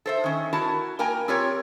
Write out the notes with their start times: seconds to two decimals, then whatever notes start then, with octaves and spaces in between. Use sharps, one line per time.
0.06 A4 C5 E5
0.24 D#3 C#4
0.53 E4 F#4 A#4 A5
0.99 A#3 A#4 G5 G#5 A#5
1.28 C4 F4 G4 A#4 C#5